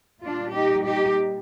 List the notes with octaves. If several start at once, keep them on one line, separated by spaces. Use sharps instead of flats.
A#2 G3 D4 F4
D#4 G4
D#4 G4